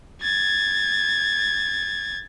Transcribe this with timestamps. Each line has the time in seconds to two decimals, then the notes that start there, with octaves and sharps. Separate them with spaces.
0.22 G#6 A6